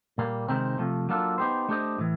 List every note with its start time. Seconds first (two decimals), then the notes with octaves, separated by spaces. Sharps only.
0.18 A#2 G3 A#3
0.48 C3 D#3 G#3 C4 D#4
0.78 C3 F3 A3
1.09 F#3 A#3 D4 F4 A4
1.38 B3 D#4 G4 C5
1.69 A3 D4 G4 C5 D#5
1.99 A2 E3